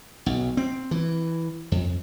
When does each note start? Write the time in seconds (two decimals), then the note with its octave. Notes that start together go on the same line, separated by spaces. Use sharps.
0.26 B1
0.57 C4
0.91 E3
1.72 F2